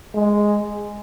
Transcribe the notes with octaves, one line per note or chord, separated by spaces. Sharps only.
G#3